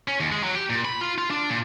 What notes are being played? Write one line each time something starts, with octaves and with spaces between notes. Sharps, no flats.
C#4
D#2
G#3
F#3
G4
A#2
B5
F4
F4
D4
A#2